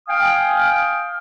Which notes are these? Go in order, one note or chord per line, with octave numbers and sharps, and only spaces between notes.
F5 G5 G#5 D#6 F6